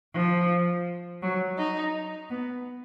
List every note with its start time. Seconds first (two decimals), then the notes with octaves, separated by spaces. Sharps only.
0.14 F3
1.22 F#3
1.58 D#4
2.30 B3